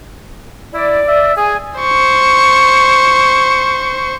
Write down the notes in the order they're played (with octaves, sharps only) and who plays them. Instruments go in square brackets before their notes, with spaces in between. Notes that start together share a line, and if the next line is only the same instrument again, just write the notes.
[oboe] E4 [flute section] D5
[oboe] E5
[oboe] G#4 [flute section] G#5
[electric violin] C5 C#6